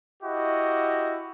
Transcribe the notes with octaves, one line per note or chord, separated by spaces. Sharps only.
E4 F#4 G4 D#5